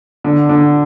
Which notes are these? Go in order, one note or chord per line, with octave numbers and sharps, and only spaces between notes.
D3
D3